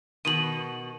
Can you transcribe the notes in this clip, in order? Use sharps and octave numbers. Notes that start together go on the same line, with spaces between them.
B2 D#3 D#7 F#7